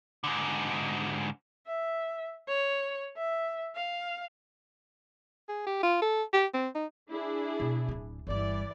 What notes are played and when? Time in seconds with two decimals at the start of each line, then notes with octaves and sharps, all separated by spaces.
0.24 G#2 D3
1.67 E5
2.48 C#5
3.17 E5
3.75 F5
5.49 G#4
5.66 G4
5.83 F4
6.02 A4
6.33 G4
6.54 C4
6.75 D#4
7.10 D4 E4 G#4
7.60 B2
7.89 D1 D4
8.27 G1 E3 G3 D5